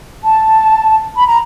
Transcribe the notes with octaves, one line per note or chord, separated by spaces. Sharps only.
A5
B5
A#5